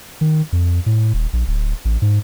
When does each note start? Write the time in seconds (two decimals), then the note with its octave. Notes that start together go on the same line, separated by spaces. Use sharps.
0.21 D#3
0.52 F2
0.86 A2
1.14 D#1
1.33 A#1
1.47 D1
1.85 A1
2.02 G#2